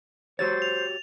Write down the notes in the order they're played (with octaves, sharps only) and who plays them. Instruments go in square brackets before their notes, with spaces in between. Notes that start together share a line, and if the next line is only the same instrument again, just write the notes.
[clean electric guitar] F#4 G4 C#5 [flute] C5 [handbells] A6
[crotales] F7